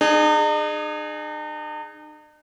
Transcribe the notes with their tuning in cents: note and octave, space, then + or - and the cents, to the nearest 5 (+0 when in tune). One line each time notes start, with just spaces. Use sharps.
D#4 -45 G#4 +0